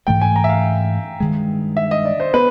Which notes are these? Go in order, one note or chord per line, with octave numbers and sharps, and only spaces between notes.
G#2 E3 A3 D4 G5
G#5
A#5
E5
F5
G2 D#3 G#3
E5
D#5
D5
C5
B3 B4